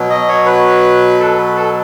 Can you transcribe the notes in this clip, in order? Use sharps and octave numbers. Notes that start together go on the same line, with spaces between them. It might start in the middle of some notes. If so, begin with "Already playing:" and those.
Already playing: B2 F#3
D#5
C#5
B4
A4
B4
A4